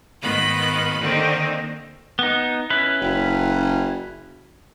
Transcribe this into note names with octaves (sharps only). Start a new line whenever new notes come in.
G#2 D#3 B3 F4 B5 F#6
D3 D#3 A#3 C4 D#4
B3 D#4
C#4 E4 B4
F#1